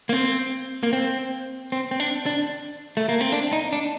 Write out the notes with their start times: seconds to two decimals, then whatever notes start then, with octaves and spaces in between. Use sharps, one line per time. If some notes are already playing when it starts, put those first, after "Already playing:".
0.09 A#3
0.13 C4
0.83 A#3
0.93 C4
1.72 C4
1.91 C4
2.00 D4
2.26 D4
2.97 A3
3.09 A#3
3.21 C4
3.32 D4
3.53 D#4
3.73 D4